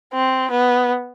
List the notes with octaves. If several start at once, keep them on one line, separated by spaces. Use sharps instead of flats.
C4
B3